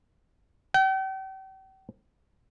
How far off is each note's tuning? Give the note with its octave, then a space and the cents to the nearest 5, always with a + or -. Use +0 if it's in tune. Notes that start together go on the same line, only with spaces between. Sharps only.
G5 -40